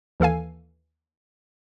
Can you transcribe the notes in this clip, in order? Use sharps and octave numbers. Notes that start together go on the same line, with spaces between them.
D#2 E3 A4 F5 G#5